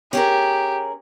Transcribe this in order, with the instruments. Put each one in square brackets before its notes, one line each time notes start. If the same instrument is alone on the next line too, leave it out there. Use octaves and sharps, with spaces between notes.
[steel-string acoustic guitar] C#4 G#4 A#4 [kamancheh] G4